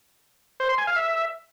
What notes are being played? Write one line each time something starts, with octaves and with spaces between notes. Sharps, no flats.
C5
C6
G#5
F5
E5